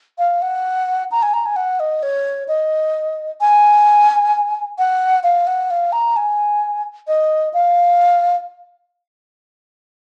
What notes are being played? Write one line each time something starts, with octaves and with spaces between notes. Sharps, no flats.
F5
F#5
A#5
G#5
A#5
G#5
F#5
D#5
C#5
D#5
G#5
F#5
F5
F#5
F5
A#5
G#5
D#5
F5